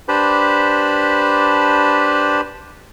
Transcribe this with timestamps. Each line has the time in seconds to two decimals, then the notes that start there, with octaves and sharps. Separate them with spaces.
0.08 D4 G4 B4 C5 A5 B5